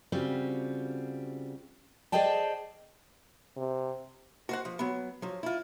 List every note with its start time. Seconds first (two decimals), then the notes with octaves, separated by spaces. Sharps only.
0.12 C#3 G3 C4 F4 F#4
2.12 G#4 C5 D5 D#5 G5 A5
3.56 C3
4.49 F#4 C5 F#5
4.65 F3
4.79 F#3 B3
5.22 F3 F#3
5.43 E4 F4